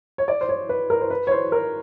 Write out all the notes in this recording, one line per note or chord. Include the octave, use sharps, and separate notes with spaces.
C#5
D5
C5
C#5
B4
A#4
C5
B4
C#5
C5
A#4